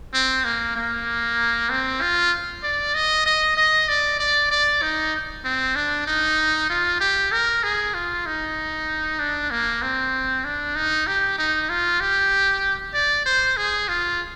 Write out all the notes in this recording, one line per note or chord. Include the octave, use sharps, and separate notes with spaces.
C4
A#3
A#3
C4
F4
D5
D#5
D#5
D#5
D5
D5
D5
D#4
C4
D4
D#4
F4
G4
A#4
G#4
F4
D#4
D4
A#3
C4
D4
D#4
G4
D#4
F4
G4
D5
C5
G#4
F4